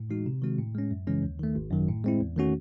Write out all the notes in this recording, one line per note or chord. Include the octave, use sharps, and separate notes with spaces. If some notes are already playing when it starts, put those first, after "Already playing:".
Already playing: A2
E3 G#3 D#4 F#4
C3
D#3 G#3 C4 F#4
A2
G#3 C#4
F#2
C#3 E3 G#3 C#4
D#2
D#3 A3
G#1
F#2 D#3 F#3
A2
G#3 C4 E4
E2
D#3 A3 C#4 F#4